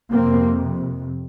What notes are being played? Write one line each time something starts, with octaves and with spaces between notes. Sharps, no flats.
F2 C3 A#3 C4